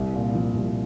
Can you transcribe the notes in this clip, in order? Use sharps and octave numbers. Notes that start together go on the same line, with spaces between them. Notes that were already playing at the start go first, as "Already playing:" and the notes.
Already playing: C2
A#2
F3
C2